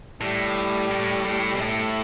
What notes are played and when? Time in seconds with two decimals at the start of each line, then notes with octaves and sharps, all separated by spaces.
0.21 A2 G3
0.91 A2
1.25 A2
1.55 B2
1.60 A2 A3